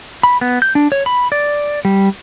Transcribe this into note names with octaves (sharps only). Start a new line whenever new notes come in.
B5
B3
G6
D4
C#5
B5
D5
G3